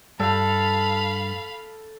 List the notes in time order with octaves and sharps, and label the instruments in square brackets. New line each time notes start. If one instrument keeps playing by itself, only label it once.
[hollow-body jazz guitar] G2 [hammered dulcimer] A4 [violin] F5 B5